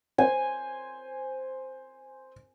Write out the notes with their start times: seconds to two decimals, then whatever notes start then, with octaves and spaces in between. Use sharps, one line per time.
0.18 C5 G#5